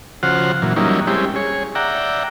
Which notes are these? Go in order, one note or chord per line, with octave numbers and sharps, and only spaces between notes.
C#3 F3 F#4 C5 F#5 F6
A#2 E3 F#3
F#3 G3 A#3 C#4 D#4 E4
G3 G#3 C4 C#4 E4 G4
G#4 C#5
D5 E5 F#5 G5 A#5